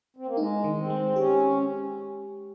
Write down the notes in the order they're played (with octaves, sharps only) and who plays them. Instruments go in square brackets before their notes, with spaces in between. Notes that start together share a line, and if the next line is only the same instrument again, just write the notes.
[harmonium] C4
A#3
[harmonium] G#3 [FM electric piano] D#4
[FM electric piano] D#3
[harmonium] C4
[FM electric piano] G#3
[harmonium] C#4 [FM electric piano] G4